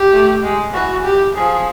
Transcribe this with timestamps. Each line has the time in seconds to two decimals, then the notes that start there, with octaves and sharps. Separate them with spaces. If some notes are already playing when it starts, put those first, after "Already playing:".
Already playing: G4
0.12 A3
0.43 G#3
0.73 E3 F#4
1.05 G4
1.35 F3 G#4